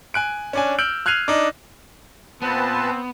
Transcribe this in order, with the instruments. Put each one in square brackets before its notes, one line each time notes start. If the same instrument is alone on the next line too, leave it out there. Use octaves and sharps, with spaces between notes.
[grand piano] G#5 F#6 D7
C#4 D4 G#5
E6 F6 G6 D7 F#7
F6 F#6 G#6 C7 D#7 F7
D4 D#4
[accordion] A#2 B4 A5 [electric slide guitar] B3 [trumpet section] C4